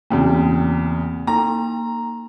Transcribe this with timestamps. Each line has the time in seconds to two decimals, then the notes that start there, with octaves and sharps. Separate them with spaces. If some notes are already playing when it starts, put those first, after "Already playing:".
0.10 E2 C#3 A#3 C4
1.27 A#3 D#4 A#5